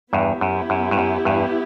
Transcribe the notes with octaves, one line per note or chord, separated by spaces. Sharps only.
E2 G2 B3 E4 G4
F#2
F#2
G2
F#2
E2 G2